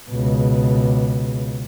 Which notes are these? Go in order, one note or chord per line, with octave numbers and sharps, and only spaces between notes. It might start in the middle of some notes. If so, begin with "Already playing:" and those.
C#2 B2